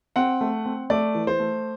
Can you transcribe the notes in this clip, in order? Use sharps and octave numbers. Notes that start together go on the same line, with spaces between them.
C4 F#5
A3
C4
A3 D5
E3
C5
A3